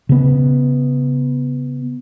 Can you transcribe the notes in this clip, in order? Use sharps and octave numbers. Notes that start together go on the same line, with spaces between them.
C#3 B3